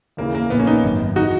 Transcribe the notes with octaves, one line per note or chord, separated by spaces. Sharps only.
D#2 C#3 E3 A#3
A#3
A#1 A#2 B3
A#3 C#4
B3 D#4
G#1 F#2 D#3
E3 D#4 F#4